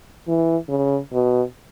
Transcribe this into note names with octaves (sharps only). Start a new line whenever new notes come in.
E3
C#3
B2